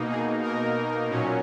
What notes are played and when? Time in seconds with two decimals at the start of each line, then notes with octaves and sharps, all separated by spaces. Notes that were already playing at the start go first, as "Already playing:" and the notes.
Already playing: B2 A#3 D#4
0.09 G#4
0.42 A#4
1.10 A#2 F#3 C#4